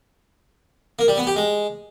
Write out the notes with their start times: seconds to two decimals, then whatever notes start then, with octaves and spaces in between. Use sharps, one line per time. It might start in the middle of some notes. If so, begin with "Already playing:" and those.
0.99 A#3
1.08 G3
1.18 B3
1.27 G4
1.36 G#3